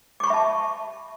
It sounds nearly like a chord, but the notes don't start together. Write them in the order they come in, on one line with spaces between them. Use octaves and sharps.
D6 C#6 B5 E5 A5